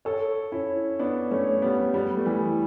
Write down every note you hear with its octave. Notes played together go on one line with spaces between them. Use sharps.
A4 C#5
C#4 E4
B3 D4
A3 C#4
G3 B3
G3 B3
A3
E3 G3